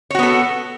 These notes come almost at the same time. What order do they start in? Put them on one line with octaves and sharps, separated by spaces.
C#5 F#4 B3 A4